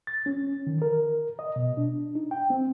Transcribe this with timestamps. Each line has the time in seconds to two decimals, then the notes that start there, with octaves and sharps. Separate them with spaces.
0.07 A6
0.26 C#4
0.67 D#3
0.82 A#4
1.39 D#5
1.56 B2
1.77 D4
2.15 D#4
2.31 G5
2.50 C4